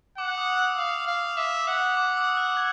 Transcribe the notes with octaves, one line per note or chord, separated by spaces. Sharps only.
F#5 D6
D#6
D#6
E6
F5 D#6
F5
E5 D6
D#6
F#5
D#6
D6
E6
F#6
G#6